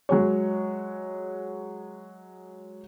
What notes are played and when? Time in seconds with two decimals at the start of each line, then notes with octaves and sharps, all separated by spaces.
0.09 F#3 G#3 C#5